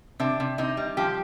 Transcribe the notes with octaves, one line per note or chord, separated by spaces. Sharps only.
C3 D4
C3
C3 D#4
G3
F3 G4